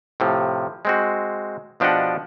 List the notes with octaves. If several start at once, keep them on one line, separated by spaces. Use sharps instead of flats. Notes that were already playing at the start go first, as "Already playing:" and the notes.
A2 C3 F3
G#3 C4 F#4
B2 F3 D4 G4 D#5 F#5